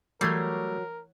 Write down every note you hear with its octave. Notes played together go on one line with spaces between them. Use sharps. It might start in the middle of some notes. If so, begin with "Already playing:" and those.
E3 F#3 G3 A3 A#4 G#6 C7